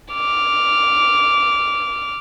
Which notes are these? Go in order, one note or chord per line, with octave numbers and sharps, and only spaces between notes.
D6 F6